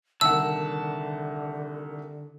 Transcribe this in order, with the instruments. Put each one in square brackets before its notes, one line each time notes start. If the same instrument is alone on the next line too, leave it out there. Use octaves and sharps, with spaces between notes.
[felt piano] C2 D#3 F#5 [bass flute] D3 [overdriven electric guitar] A5 [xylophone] E6